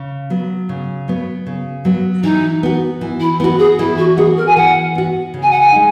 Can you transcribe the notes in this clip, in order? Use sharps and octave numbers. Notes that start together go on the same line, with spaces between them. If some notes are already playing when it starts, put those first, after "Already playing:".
Already playing: C#3
F#3 B3
C#3
F#3 B3
C#3
F#3 B3
E3 D#4
B3 F#4
E3
E4
B3 E4 F#4
G#4
E3 E4
F#4
B3 F#4 G#4
A#4
G#5
E3 F#5
B3 F#4
C#3
G#5
F#5
G#5
G#3 D#4